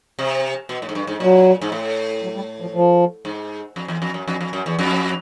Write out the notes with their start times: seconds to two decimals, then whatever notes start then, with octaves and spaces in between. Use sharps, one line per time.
0.19 C3
0.69 B2
0.82 A2
0.89 G#2
0.95 G2
1.07 G#2
1.20 A#2 F#3
1.62 G#2
1.72 A2
2.23 F#3
2.35 G3
2.61 F3
2.74 F3
3.25 G#2
3.76 F2
3.88 E2
4.02 F2
4.14 F#2
4.28 F2
4.41 F2
4.53 F#2
4.66 E2
4.79 F2